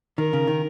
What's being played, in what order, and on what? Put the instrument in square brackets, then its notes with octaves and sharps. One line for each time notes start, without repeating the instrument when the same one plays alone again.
[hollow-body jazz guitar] D#3 [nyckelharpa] A#4
[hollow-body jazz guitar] C#3
D#3